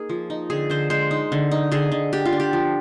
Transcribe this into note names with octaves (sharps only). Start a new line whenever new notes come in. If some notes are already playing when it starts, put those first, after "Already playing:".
Already playing: A#3 D#4 G#4
F3
D#4
D3 G#4
D3 C5
G#3 C5
D#4
D3
D#4
D3 G#4
D3
D4 G4
F4
D4
G4
F3